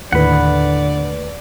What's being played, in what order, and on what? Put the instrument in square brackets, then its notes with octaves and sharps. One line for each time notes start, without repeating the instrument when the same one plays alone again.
[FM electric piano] D#2 A2 B4 [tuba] D3 [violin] D5 [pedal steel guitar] F#5 B5